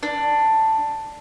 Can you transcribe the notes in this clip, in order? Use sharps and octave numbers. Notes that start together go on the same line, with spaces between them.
D4